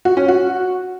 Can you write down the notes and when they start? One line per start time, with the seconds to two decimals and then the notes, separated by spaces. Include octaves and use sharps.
0.05 F#4
0.17 C#4
0.28 F#4